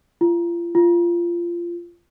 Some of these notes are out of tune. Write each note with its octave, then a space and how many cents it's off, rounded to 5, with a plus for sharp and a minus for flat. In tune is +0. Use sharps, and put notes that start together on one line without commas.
F4 -35
F4 -20